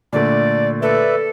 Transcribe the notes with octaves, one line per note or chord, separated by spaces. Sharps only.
A#2 D3 A3 D5
A4 B4 D5 E5